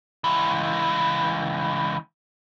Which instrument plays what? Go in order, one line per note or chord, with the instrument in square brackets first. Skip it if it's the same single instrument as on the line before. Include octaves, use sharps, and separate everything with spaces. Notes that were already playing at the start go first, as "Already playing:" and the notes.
[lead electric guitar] C#2 E3